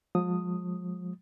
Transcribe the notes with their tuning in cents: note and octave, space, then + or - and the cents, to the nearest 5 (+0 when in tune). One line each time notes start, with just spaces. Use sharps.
F3 +35 G#3 +0 D#6 +0